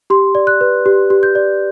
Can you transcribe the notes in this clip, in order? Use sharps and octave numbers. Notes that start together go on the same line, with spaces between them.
G4 C6
D5
F#6
B4
G4
G4
G6
D5